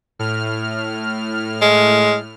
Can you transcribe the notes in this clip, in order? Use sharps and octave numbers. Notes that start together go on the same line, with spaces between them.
A2 F6
G#3